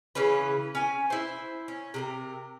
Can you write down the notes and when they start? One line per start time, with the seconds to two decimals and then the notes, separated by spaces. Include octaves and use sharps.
0.15 C#3 E3 C#4 B4
0.75 C#4 G#5
1.10 E4 C5
1.68 C#4
1.94 C3 G#4 A#4